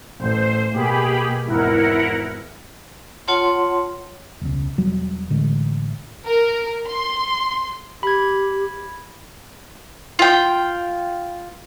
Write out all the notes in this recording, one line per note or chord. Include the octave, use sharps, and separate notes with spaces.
A1 C5
B2 A#3 G4 G#4 B5
G#1 E2 E4 A#4 F#5
F4 C#5 F#5 A5 C6
E1 C#2
E1 F#3 G3
A1 D3 G#3
A#4
C6
G4 B5 G#6
F4 G5